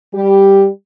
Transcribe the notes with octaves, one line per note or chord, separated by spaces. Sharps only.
G3 G4